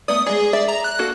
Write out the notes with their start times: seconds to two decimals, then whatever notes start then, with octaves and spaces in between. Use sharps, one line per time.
0.08 A3 B3 D5 D#6
0.26 G#3 G#4 D5
0.53 D5 E5
0.68 A#5
0.84 F#6
0.99 A#3 F#4 A4